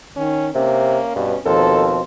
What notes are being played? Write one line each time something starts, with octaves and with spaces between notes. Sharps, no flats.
D#3 C#4
C3 A#3 C#4
G2 B2
D#2 B2 F3 C4 A4